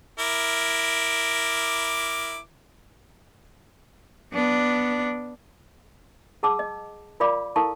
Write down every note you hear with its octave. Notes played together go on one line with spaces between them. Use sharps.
E4 A#4 D6
B3 D4
G#4 F#5 A5 D6 E6
D#5
F4 A#4 D5 F5 B5 D6
E4 A4 A#4 F5 A5 C#6